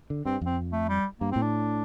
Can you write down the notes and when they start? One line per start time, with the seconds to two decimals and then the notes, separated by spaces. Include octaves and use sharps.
0.10 D3
0.25 G2 C4
0.41 F2 C4
0.72 A3
0.89 G3
1.20 G2 A#3
1.32 A2 C4
1.42 D4